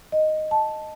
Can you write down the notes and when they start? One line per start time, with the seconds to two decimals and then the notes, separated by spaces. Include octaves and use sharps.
0.12 D#5
0.51 A5